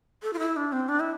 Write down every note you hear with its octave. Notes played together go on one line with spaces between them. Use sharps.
A4
F4
E4
D4
C4
D4
E4